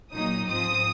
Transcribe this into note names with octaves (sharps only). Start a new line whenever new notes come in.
A#2 F#3 A#3 D#4 D#6
G#2 F3 C4 D#6